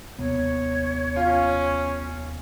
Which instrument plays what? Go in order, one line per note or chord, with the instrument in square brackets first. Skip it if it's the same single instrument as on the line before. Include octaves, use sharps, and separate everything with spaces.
[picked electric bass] D#2 C3 B3 [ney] C#5
[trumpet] C#4 [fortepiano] F4